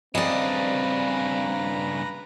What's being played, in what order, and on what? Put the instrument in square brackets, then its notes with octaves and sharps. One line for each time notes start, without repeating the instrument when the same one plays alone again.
[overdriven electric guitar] G2 C#3 [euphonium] C4 [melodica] B4 A#5 [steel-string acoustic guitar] D5 D#5